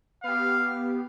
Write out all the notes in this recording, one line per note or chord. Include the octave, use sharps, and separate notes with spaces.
B3 G4 F5